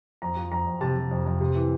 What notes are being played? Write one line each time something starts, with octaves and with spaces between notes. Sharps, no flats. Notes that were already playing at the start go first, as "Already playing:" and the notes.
F2 A#5
F3
F2 A#5
F2
C3 A5
C3
F2
F2
C3
E3